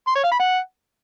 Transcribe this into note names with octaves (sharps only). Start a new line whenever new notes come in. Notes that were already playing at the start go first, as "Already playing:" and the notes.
C6
C#5
F5
B5
F#5